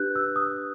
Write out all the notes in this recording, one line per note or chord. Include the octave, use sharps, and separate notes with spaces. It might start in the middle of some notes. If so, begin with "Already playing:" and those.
Already playing: D4 G4 B4 F#6 G6
E6
D#6